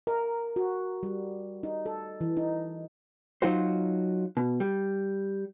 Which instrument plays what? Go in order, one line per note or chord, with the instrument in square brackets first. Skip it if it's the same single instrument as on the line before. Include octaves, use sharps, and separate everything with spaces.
[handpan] A#4
F#4
G3
D#4
A4
E3
D#4
[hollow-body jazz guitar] F#3 D#4 F4 F#4 C5
B2
G3